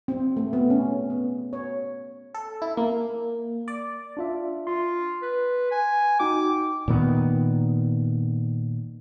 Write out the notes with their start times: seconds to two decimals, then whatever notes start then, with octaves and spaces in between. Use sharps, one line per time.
0.08 C4
0.37 A3
0.53 B3
0.70 C#4
1.10 B3
1.53 C#5
2.35 A4
2.62 E4
2.77 A#3
3.68 D5
4.17 D4 F4 E5
4.67 F4 C6
5.22 B4
5.71 G#5
6.20 D#4 F#4 G5 D6
6.88 A#2 D#3 B3